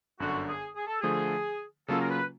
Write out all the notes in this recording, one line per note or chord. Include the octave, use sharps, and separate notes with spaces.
G1 F#2 D3 F#4
G#4
G#4
A4
D3 F3 A3 G#4
C#3 F#3 A#3 C#4 F4 A4
A#4
B4